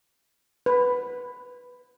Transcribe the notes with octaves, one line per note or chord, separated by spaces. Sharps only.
B4